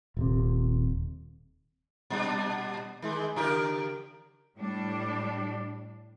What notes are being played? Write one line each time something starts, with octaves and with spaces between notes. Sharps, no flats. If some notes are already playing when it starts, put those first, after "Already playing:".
D#1 C3
A#2 G3 D4
D#3 G#3
C#3 G4 A#4
A2 G3 D4